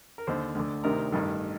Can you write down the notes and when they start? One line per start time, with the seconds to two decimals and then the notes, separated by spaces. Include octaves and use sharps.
0.18 A#4
0.27 D#2 D3 C5
0.55 D2 D3
0.84 D2 C3 D#3 A#4
1.12 A1 G2 D#3